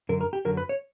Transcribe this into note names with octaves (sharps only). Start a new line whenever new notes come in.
F#2 D3 F#3 A#4
A#4
G4
F#2 D3 F#3 A#4
B4
C#5